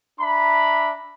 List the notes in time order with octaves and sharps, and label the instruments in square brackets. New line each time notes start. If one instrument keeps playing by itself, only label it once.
[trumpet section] D4 E5 A#5 B5